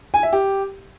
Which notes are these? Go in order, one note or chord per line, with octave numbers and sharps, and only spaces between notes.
G#5
E5
G4